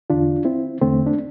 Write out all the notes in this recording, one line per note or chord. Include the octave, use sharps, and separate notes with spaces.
E2 D3 D4 F4
C4 E4
E2 D3 A3 C4
D4